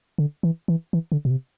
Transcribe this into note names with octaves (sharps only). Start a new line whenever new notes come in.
D3
E3
E3
E3
D3
B2
C3